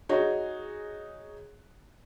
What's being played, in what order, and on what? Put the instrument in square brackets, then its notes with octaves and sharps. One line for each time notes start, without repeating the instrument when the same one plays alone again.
[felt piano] D#4 F#4 G#4 C#5